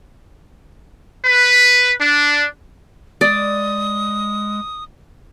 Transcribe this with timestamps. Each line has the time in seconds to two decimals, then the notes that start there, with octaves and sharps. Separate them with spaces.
1.25 B4
1.99 D4
3.21 G#3 D5 D#6